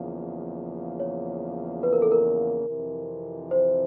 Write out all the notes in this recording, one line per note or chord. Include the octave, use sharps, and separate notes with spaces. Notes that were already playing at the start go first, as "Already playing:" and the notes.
Already playing: E2 C#3 F3 A#3
C#5
B4
A#4
A4
A#4
F2 C3 E3
C5